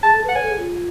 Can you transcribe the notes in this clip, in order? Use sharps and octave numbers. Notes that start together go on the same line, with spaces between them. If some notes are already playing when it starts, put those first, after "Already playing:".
G#4 A5
A4
B4 F#5
C#5 G#5
A4
G#4
F4